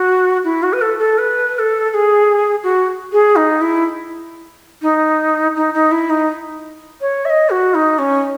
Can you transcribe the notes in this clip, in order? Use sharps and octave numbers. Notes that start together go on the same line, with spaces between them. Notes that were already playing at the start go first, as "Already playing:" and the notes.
Already playing: F#4
E4
F#4
B4
A4
A4
B4
B4
A4
A4
G#4
F#4
G#4
D#4
E4
D#4
D#4
D#4
E4
D#4
C#5
E5
D#5
F#4
D#4
C#4